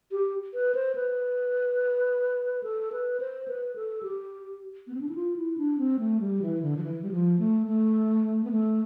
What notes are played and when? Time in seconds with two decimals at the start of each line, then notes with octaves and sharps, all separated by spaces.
0.12 G4
0.54 B4
0.75 C5
0.95 B4
2.63 A4
2.92 B4
3.20 C5
3.48 B4
3.76 A4
4.03 G4
4.87 B3
4.94 C4
5.01 D4
5.09 E4
5.15 F4
5.36 E4
5.58 D4
5.78 C4
5.99 A3
6.20 G3
6.42 E3
6.62 D3
6.77 F3
6.83 E3
7.02 G3
7.11 F3
7.39 A3
7.67 A3
8.44 B3
8.51 A3